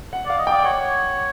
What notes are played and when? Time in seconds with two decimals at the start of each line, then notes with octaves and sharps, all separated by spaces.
0.13 F#5
0.26 D5 F5
0.38 D#5
0.47 D5 G5
0.64 C#5 F#5